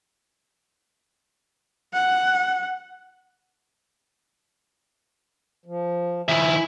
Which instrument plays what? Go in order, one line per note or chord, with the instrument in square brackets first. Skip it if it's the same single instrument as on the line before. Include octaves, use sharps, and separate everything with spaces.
[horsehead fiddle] F#5
[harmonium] F3
[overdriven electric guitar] D#3 F3 [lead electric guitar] E4 E5 [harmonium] G#5